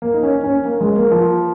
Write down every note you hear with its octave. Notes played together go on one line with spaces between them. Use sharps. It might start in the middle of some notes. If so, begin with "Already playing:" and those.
A#3
D#4
C#4
C#4
A#3
G#3
A#3
F3